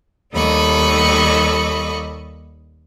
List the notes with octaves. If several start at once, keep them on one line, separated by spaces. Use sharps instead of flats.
D#2 G3 A4 D#5 B5 C#6